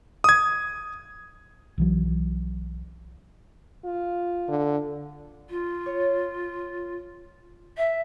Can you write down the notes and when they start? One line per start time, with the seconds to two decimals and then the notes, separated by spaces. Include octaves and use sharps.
0.24 D#6 G#6
1.78 B1 E3 F#3
3.84 F4
4.49 D3
5.50 F4
5.86 C#5
7.77 E5